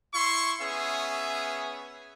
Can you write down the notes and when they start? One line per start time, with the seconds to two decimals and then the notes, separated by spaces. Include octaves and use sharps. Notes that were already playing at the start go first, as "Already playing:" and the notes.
0.14 E4 C6 C#6
0.61 B3 C#4 G#4 E5